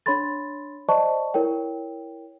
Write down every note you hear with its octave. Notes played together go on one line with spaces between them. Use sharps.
D4 C#5 B5 C6 A6
C5 D5 D#5 A5 C#6
E4 A#4 C#5 G5